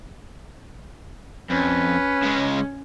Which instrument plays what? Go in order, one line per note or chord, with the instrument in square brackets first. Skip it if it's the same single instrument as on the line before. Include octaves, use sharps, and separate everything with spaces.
[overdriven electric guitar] F2 [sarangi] C#4 [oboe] B4
[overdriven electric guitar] C#3 G#3